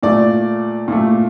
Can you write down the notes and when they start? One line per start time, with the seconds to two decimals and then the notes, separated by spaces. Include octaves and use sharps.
0.03 A#2 A3 D5
0.88 A#2 A3